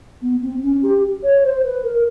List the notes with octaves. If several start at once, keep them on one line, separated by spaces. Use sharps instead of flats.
B3
C4
C#4
G4
C#5
C5
B4
A#4